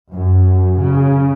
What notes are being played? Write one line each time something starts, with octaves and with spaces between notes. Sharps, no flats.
F#2
C#3